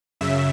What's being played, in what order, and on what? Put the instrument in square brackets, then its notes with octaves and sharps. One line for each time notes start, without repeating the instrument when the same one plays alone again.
[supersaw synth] F#2 C#3 E5